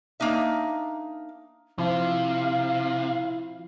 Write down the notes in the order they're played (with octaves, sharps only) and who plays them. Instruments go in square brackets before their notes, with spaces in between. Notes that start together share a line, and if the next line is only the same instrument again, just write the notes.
[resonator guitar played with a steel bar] A#3 D4 D#4 E5
[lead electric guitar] C3 [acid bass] F3 [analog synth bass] E4 [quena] F5